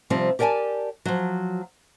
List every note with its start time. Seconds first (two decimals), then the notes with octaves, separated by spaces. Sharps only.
0.10 C3 F3 G3 C4
0.39 G4 A#4 D5 F#5 G#5 A5
1.05 F3 F#3